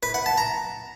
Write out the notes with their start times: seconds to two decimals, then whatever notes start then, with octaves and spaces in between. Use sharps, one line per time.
0.03 B4
0.14 F#5
0.26 A5
0.38 A#5